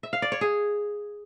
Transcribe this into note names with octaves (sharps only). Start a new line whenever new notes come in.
E5
F5
D5
C#5
G#4